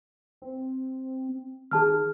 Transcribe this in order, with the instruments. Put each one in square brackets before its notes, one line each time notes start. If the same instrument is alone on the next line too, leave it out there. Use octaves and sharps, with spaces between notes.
[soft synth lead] C4
[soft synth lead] D#3 [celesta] G#4 A5 F6